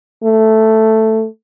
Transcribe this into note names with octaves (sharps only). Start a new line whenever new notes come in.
A3